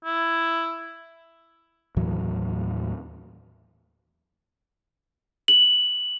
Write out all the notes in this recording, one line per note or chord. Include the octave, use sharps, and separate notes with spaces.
E4
D#2 A2 E3 F#3
F#7